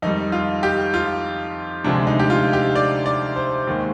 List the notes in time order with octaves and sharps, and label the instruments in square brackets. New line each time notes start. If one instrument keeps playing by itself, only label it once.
[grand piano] F2 D#3 G3 D#4
F4
G4
F4
D2 C3 F3 G#3 D4
D#4
G4
F4
G4
D5
D5
C5
D#2 D#3 G#3